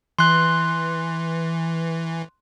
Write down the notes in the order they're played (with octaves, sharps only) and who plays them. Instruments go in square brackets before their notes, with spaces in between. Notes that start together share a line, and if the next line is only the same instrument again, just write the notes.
[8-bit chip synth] E3 [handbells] C6 F#6